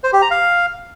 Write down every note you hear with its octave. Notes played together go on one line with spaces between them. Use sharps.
C5
G4
A#5
F5